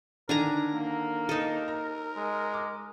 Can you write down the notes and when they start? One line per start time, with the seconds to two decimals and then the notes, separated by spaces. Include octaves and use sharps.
0.29 D3 D#3 D4 A#4 G#5 A#5
0.74 A#3
1.29 D#4 A4 D#7
1.68 A#5
2.16 G#3
2.53 D6